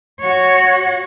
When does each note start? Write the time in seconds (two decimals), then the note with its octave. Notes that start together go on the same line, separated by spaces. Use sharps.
0.20 F#4 C#5